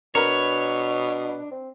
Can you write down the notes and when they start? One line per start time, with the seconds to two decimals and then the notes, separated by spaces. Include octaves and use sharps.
0.15 B2 D4 A#4 B4 C#5
1.51 C4